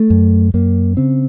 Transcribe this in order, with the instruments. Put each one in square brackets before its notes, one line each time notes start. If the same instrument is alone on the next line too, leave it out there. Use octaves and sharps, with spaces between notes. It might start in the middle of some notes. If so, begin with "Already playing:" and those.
Already playing: [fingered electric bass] A3
F#2
F#2 A#3
C#3 C4